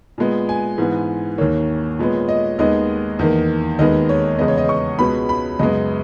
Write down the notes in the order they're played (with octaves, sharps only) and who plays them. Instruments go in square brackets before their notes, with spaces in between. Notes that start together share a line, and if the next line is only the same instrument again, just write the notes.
[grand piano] A#2 G#3 B3
G#5
G#2 E3 B3
D#2 D#3 A#3 C#5
A#2 G#3 B3
D#5
D#2 D#3 G#3 B3 D#5
E2 D#3 A#3
D#2 D#3 G#3 B3 D#5
C#5
E2 C#3 G#3 B3 D#5
C#5
D#5
C#6
C#2 B2 G#3 B3 B5
B5
F#2 C#3 G#3 B3 D#5